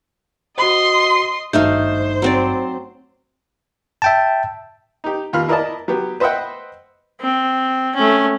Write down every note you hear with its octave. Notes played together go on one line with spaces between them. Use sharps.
F#4 C5 D#5 C6
G#1 G2 A3 D#4 C5 F5 G6
F#3 C4 D5
E5 G5 A5
D#4 G4
D#2 F4 B5 F6
E4 A#4 B4 D5 D#5 A5
F#3 B3 G4
B4 C5 D#5 E5 F#5 G5
C4
A3 C#4